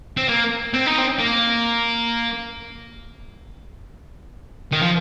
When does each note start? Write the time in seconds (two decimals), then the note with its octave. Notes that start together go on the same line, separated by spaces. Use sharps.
0.17 C4
0.29 A#3
0.74 C4
0.86 D#4
0.98 C4
1.20 A#3
4.72 D#3
4.82 F3